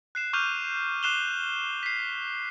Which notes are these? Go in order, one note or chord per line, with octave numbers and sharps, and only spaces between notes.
F#6 C7 E7
C#6 D6 F6 G6 D#7 F7
D6 F#6 C7 E7 F7 G7
B6 C7